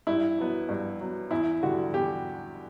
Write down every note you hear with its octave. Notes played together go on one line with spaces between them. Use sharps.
G2 E4
F#3 B3
G2
F#3 B3
E2 E4
D3 G3 F#4
E2 G4